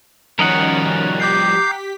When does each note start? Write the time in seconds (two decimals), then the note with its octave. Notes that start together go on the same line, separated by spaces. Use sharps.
0.39 D#3 F3 G3 C#4 A#4 D#5 F#5
1.20 G4 D6 G6 B6 C7